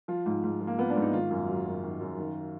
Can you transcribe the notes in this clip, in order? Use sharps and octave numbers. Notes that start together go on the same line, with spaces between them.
F3 F4
G#2
G#2
F3
A#3
F3 B3
D4
G#2
D#4
D#3 F4
F#2
F#3
F#2
D#3
F#2
D#3